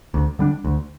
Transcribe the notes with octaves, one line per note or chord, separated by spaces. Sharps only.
D2
D3 G3 D4
D2